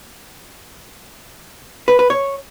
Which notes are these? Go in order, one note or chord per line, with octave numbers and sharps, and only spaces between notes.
B4
B4
C#5